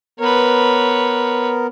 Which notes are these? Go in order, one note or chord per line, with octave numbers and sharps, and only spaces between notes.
B3 A#4 B4 C#5